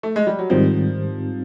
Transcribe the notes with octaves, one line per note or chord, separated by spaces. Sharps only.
A3
G#3
G3
F#3
G#2 D#3 F3 G3 C4